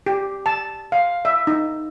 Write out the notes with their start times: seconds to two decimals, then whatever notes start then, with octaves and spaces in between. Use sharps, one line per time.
0.06 G4
0.46 A5
0.92 F5
1.25 E5
1.47 D#4